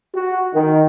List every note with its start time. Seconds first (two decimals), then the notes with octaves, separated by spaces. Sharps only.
0.15 F#4
0.55 D#3